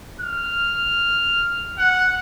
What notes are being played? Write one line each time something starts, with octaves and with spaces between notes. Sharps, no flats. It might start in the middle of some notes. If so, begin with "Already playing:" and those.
F6
F#5